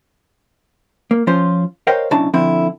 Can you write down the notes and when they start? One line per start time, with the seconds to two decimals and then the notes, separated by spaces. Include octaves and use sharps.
1.11 A#3
1.27 F3 C#4 F4 C5
1.87 A#4 C5 C#5 D#5 F5 G5
2.11 B1 C#3 D4 E4 A5 A#5
2.34 D3 F3 C4 E4